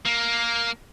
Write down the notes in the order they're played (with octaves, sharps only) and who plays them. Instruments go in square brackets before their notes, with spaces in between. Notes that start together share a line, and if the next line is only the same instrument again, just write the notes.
[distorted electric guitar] A#3